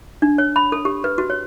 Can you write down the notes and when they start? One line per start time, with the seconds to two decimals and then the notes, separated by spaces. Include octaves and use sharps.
0.22 D4
0.38 C#5
0.56 B5
0.72 A4
0.85 G4
1.04 B4
1.18 F#4
1.30 C#5